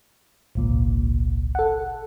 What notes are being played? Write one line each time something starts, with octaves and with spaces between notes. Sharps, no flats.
G#1 C#2 A#2
A4 F#5